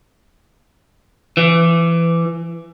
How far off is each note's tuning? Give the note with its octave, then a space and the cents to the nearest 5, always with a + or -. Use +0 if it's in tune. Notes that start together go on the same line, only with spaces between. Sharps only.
E3 +25